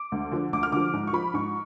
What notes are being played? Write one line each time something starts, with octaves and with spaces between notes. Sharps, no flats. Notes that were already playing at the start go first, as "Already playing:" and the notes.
Already playing: D6
D2
D3 F3
D2 D6
F6
D3 F3 D6
G#2
C#6
F3 B5
G#2 C#6